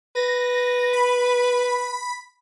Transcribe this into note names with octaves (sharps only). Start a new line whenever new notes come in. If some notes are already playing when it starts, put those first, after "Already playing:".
B4 A#6
B5